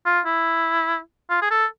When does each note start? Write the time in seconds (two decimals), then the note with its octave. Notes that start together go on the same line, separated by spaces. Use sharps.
0.06 F4
0.26 E4
1.30 F4
1.42 G#4
1.51 A4